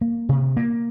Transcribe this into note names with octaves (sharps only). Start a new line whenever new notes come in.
A#3
C3
A#3